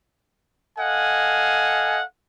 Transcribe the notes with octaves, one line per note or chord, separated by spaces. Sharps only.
A4 D#5 F5 F#5 G#5